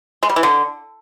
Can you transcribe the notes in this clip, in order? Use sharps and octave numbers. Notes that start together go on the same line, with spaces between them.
G#3
G3
E3
D3